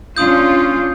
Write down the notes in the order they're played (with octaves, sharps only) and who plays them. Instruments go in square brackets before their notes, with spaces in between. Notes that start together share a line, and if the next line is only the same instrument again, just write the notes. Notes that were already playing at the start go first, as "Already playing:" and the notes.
[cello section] C#4 D4 F4 [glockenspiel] D#6 G6